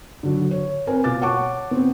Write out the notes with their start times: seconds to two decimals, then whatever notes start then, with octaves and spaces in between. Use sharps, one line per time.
0.23 D3 F#3
0.51 C#5
0.87 C4 A#4 B4 G#5
1.04 B2 F4 F5 D6 A6
1.21 C#5 F#5 A5 C#6 D6
1.71 B3 C4